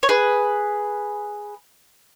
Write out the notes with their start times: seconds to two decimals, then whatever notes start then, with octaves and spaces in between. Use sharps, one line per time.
0.03 C#5
0.09 G#4 B4